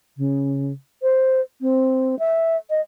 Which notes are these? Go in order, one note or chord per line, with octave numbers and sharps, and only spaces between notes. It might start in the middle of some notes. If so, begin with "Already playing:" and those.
C#3
C5
C4
E5
D#5